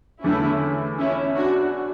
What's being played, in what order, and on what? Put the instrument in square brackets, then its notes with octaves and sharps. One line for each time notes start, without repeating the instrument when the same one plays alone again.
[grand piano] E2 D3 A3 [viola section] C#4 E4
[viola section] C#4 E4
D4 F#4